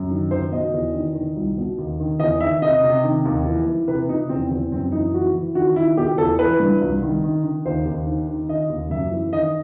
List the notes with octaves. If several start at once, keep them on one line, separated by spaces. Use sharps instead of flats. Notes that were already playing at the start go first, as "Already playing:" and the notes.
Already playing: F#2
D#3
D#3 C5
B2 D#5
E2
D#3
D#3
C2
B2
D#2
D#3
E2 D#5
D#3 E5
C3 D#5
C3
D#3
D#2
E3
E3
C3 B4
C3 D#4
E2 C4
E2
F#2 C4
E3 D#4
E3 F#4
E3
D#3 F#4
D#3 E4
B2 G4
E2 A4
E3 B4
G2
C2
D#3
D#3
D#3
D#2 C5
D#2
D#3
D#3
D#3 D#5
D#2
F#2 E5
E3
D#3 D#5